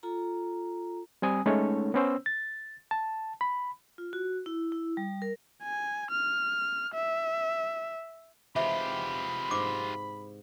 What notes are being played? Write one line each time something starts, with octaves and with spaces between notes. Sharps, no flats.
F4 A4 A#5
G3 C4 G#5 D#6
G#3 A3 C#4 D#4 A4 C#5
B3 C#4 C5 E6
A6
A5
B5
F4
F#4
E4
E4
G3
A#4
G#5
F6
E5
C3 E3 G#3 F4 G4 E5 B5
G#2 C6 D6